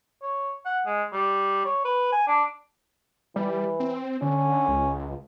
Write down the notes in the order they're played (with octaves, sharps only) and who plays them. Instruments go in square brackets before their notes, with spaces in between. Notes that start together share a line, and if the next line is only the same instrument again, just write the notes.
[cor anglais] C#5
F#5
G#3
G3
C#5
B4
G#5
D4
[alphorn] E3 [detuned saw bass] G3
[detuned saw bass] C4
[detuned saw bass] D3 [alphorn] C#4
[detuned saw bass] C#2